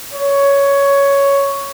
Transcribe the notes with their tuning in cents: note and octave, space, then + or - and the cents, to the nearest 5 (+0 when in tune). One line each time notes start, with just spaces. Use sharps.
C#5 +10